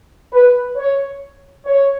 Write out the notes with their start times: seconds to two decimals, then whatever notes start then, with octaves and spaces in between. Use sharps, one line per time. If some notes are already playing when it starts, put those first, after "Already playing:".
0.32 B4
0.76 C#5
1.66 C#5